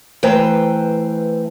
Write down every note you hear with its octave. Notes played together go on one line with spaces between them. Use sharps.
E3 A3 B4 C5 G5 A#5